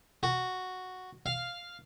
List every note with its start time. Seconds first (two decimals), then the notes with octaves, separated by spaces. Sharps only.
0.23 F#4
1.26 F5